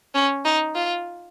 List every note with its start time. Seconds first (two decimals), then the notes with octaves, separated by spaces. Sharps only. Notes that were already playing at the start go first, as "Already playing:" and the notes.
0.15 C#4
0.45 D#4
0.75 F4